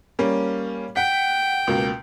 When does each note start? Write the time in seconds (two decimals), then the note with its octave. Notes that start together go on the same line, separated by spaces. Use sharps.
0.19 G3 A#3 C#4
0.96 F#5 G5 B6
1.67 C#2 B2 A#3